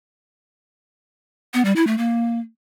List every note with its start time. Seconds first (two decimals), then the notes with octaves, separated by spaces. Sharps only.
1.54 B3
1.65 G3
1.76 E4
1.87 A3
1.98 A#3